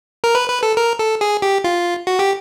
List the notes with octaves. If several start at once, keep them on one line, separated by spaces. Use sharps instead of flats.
A#4
B4
B4
A4
A#4
A4
G#4
G4
F4
F#4
G4